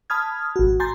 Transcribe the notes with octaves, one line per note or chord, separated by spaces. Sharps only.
A5 B5 D#6 F6 G#6
G#1 F#4
G#5 A#5 C6 G6 A6